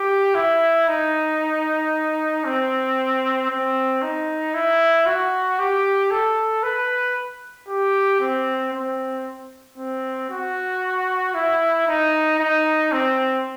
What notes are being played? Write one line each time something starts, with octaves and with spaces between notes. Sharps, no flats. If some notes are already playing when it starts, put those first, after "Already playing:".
Already playing: G4
E4
D#4
C4
C4
D#4
E4
F#4
G4
A4
B4
G4
C4
C4
C4
F#4
E4
D#4
D#4
C4